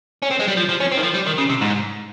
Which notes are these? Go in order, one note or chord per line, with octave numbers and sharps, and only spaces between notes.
C#4
C4
G#3
G3
F3
F3
C#4
C4
D#3
F3
G3
D#3
C#3
C3
G#2